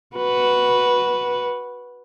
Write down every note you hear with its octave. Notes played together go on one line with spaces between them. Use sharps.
F#4 B4